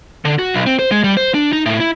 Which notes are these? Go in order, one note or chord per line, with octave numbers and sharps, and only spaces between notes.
D3
F#4
B1
C4
C5
G#3
G3
C5
D4
D#4
A2
E4